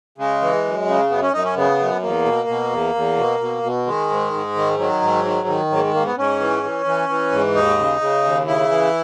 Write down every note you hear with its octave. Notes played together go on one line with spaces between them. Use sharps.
C#3 G#3
E3
F#2
C#3
F#2 B3
C#4
F#2 D#4
C#4
C#3 B3
F#2
E2 A#3
B2
B2
E2
E2
B2
B2
B2
D#3 G#3
G#2
G#2
D#3
D#3 F#3
G#2
D#3
D#3
G#2 F#3
A#3
G#3
G#2 A#3
B3
G#2 C#4
E3
E3
E3
E3
G#2
D#2 D#4
C#3
C#3
D#2
C#3 E4
E3